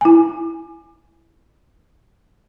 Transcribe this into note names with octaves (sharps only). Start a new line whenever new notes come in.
E4 G#5